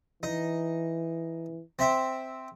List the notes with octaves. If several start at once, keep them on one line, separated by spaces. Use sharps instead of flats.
E3 D#4
C4 E5 G5